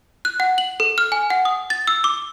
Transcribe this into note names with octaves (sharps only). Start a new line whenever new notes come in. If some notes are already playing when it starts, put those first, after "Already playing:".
F#6
F#5
F#7
A4
F6
G#5
F#5
D#6
A6
E6
D6